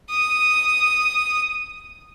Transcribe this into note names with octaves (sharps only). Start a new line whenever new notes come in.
D#6